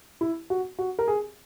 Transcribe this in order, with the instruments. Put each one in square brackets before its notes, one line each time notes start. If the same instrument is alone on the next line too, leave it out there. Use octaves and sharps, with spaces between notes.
[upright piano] E4
F#4
F#4
A#4
G#4